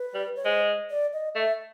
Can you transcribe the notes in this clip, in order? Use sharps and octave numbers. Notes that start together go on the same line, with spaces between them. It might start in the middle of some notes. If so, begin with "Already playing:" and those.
Already playing: B4
G3
C#5
G#3 C5
D5
D#5
A3 E5